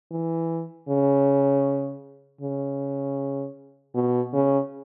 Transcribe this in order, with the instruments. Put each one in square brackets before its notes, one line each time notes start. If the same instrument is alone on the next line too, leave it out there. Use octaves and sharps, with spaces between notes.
[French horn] E3
C#3
C#3
B2
C#3